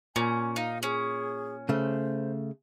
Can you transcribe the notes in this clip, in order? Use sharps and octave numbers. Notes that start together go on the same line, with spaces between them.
A#2 C#4 G#5
D#4 F5
C#4 G#4
C#3 A3 C5